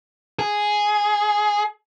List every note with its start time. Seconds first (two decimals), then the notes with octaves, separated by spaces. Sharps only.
0.39 G#4